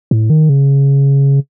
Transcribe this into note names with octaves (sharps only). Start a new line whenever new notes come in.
A2
D#3
C#3